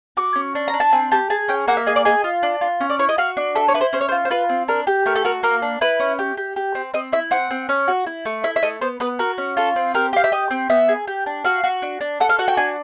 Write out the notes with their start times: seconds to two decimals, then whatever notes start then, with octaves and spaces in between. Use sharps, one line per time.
0.17 F#4 D6
0.36 C#4
0.55 D4
0.68 A#5
0.74 D4
0.80 A5
0.93 C4 G#5
1.11 G4 A5
1.30 G#4 A5
1.48 C#4 G5
1.68 A#3 F#5
1.77 E5
1.86 G#4 D#5
1.96 D5
2.05 G#4 D#5
2.24 F4
2.43 D4
2.61 F4
2.81 C#4
2.90 D5
2.99 E4 C#5
3.09 D#5
3.18 F#4 F5
3.37 D4
3.55 A4 E5
3.68 C#5
3.74 E4 B4
3.81 C5
3.93 C#4 C5
4.01 C#5
4.09 C5
4.12 F4
4.25 C5
4.30 F4 B4
4.49 C4
4.68 D4 A#4
4.87 G4
5.06 A3 A#4
5.15 A4
5.24 F#4 A#4
5.43 A#3 A#4
5.62 D4
5.81 E4 B4
6.00 C#4
6.19 G4
6.37 G4
6.56 G4
6.75 C4
6.94 C4 D#5
7.12 E4 E5
7.31 C4 F#5
7.51 C4
7.69 C#4
7.88 F#4
8.06 E4
8.25 A3
8.44 E4 E5
8.56 E5
8.63 A3 D#5
8.81 B3 C5
9.00 B3 B4
9.19 F#4 A#4
9.38 C#4
9.57 F4 A4
9.76 C4
9.94 G4 A#4
10.13 G4 F5
10.24 E5
10.32 G4 D#5
10.51 C4
10.70 B3 E5
10.88 G#4
11.07 G4
11.26 D4
11.45 F#4 F5
11.64 F#4
11.82 D4
12.01 D4
12.20 A4 F#5
12.29 F5
12.39 F#4 F#5
12.48 G5
12.57 D4 G#5